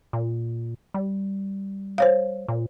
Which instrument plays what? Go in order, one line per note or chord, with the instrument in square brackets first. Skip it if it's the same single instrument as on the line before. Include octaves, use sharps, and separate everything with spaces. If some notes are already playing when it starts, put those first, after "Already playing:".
[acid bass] A#2
G3
[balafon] C5 C#5 F5
[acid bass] A#2